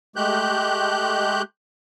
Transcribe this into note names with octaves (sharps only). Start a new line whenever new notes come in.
G#3 A3 G4 F#6 G6